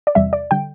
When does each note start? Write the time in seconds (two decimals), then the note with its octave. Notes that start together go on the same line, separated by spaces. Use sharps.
0.07 D5
0.15 E2 C3 G3 E5
0.33 D5
0.51 D3 G3 G5